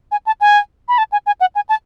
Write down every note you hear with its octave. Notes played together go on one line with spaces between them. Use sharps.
G#5
A5
G#5
B5
A5
G#5
G#5
F#5
G#5
A5